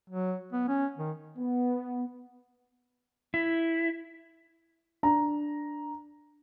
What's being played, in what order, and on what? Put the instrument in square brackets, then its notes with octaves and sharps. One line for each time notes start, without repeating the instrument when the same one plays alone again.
[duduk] F#3
B3
C#4
D#3
[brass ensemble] B3
[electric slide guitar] E4
[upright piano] D4 A#5